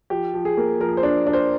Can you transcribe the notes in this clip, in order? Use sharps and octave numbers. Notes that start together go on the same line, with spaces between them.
F3 G4
F3
G#4
A#3
F3 A#4
C5
D4
D4
C5